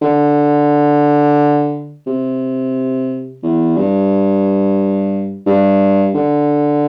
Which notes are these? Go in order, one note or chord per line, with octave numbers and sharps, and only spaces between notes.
D3
C3
E2
G2
G2
D3